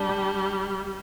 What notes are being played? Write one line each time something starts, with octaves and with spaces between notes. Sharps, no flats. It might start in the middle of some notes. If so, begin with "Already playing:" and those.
Already playing: G3 D4
G4